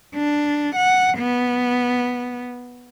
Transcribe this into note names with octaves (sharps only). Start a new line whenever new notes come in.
D4
F#5
B3